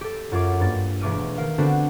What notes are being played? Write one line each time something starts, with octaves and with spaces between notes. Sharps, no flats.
G4 A4
F#2 F4 C#5 D6
G2 A#3 A6
E1 A3 D6 F6 D#7
D#3 A#4 F5
D3 B3 C4 D4 F#4